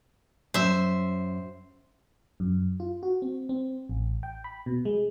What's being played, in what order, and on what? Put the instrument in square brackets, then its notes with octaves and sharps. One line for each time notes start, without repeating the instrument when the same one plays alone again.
[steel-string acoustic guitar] F#2 [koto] C5 E5
[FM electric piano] F#2
F4
F#4
C4
C4
A1
G5
B5
B2
G#3